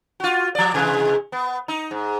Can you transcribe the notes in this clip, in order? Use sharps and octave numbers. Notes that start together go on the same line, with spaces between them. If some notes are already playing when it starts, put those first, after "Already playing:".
F4 F#4
F3 D5
C3 E3 G#3
B3
D#4
G#2